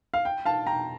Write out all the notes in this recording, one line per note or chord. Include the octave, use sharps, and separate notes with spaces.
F5
G5
F5 A5
G5 A#5